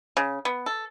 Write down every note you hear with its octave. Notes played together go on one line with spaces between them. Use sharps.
C#3
B3
A4